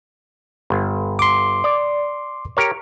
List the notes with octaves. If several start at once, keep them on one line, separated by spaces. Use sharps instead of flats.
G1
C6 D6
D5
G4 A#4 C#5